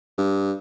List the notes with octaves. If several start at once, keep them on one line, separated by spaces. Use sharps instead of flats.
G2